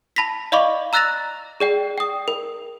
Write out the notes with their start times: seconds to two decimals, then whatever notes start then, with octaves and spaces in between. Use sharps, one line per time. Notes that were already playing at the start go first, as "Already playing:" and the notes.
0.16 A5 B5 A#6 B6
0.52 D5 D#5 F5 B5 C#6 D6
0.93 A#5 E6 F#6 A6 A#6 F7
1.60 G#4 D5 G5
1.98 G5 D#6
2.28 A#4